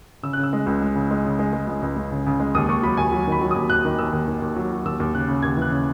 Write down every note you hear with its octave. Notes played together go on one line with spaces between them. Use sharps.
C#3 E6
C#3 F#6
E6
G#3
C#2
G#3
C#3
G#3
C#3
G#3
G#3
C#2
C#2
C#2
C#3
C#3
G#3
D#2 D#6
D#2 C#6
F#3 B5
D#2 G#5
F#3
D#3 B5
F#3
D#2 D#6
D#2 F#6
D#3
D#2 E6
D#2
D#3
D#2
F#3
F#3
D#2 E6
D#2
C#3 F#6
C#3
D#2 G#6
E3 F#6
C#3